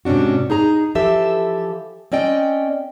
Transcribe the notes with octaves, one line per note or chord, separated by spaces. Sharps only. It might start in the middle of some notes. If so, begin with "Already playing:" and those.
G#2 C3 C#4 D4 F#4
D#4 G#4 A#5
E3 F3 G4 A4 E5
C4 C#4 D5 D#5 G5